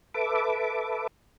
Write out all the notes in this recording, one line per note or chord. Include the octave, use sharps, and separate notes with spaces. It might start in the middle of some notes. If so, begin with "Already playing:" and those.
A4 B4 E5 D6